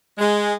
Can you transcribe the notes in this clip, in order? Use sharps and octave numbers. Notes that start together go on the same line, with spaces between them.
G#3